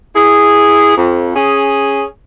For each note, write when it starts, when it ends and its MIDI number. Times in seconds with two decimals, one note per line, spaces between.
0.15 0.96 64
0.15 0.96 68
0.97 1.31 41
1.36 2.04 61
1.36 2.04 68